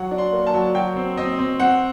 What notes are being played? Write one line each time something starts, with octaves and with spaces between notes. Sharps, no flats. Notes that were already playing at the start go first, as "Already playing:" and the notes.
Already playing: F#3 F#5
D4
C6
A#3
A5
F#3
F#3 G5
C4
C4 D#5
C4
C4 F#5